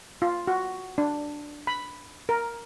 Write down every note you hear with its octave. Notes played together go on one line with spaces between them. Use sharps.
F4
F#4
D4
B5
A#4